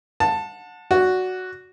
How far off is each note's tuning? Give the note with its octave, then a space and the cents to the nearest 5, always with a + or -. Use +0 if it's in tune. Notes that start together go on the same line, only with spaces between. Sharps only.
F#5 -30 A5 +10
F#4 +0 D5 -25